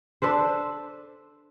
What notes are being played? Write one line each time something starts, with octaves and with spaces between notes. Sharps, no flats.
D4 A4 B4 C5